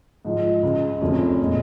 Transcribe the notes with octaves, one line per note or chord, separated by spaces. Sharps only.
G#2 F3 G#3 F4
C#2 C#3 G#3
F1 F2 C#3 F3 C#4
A#2 G#3